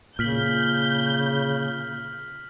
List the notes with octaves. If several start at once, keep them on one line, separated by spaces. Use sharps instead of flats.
A#2 C#3 F6 G6 B6 F#7